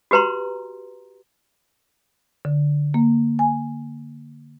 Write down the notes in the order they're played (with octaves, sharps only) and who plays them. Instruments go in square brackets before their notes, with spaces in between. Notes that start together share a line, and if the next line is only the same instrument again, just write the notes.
[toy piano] F#4 G4 B4 A#5 C6
[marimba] D3
A#3
G#5